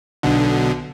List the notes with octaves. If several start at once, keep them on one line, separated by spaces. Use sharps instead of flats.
B1 B2 D3